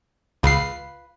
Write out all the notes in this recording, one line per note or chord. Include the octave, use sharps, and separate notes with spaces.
C#2 F4 B4 C7